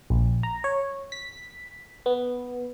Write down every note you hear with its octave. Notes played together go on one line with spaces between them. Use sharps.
A#1
A#5
C#5
B6
B3